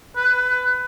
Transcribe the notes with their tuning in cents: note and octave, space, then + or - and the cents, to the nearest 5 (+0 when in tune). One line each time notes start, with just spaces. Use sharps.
B4 +20